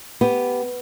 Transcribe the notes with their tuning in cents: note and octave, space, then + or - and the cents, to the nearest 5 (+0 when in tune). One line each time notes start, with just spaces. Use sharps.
B3 +0 G4 +0